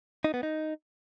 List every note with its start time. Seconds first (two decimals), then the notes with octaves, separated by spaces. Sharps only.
0.24 D#4
0.34 B3
0.43 D#4